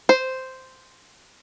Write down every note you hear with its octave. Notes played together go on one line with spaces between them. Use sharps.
C5